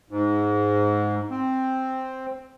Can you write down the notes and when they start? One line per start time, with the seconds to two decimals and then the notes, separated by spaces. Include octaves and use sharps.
0.10 G#2
1.30 C4